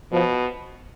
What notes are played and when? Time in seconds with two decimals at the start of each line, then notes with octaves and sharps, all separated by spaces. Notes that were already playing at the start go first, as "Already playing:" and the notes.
0.12 B2 F3